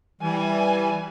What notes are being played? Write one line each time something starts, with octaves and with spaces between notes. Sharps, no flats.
E3 G3 G#5